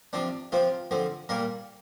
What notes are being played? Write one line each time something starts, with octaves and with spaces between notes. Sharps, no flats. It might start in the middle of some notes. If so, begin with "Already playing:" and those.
C3 F3 C4 D4
C3 F3 C4 F4
D3 F3 C4
A#2 G3 A#3 A#4